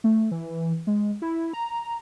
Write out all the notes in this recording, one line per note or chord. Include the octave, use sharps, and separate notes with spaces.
A3
E3
G#3
E4
A#5